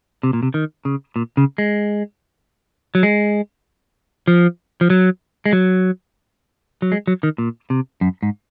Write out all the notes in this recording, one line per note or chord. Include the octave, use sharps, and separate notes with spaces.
C3
A#2
C3
D#3
C#3
A#2
C#3
G#3
F#3
G#3
F3
F3
F#3
G#3
F#3
F#3
G#3
F#3
D#3
A#2
C3
F#2
G#2